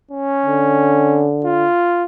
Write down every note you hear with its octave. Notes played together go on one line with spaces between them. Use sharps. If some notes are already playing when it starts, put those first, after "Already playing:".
C#4
D3
F4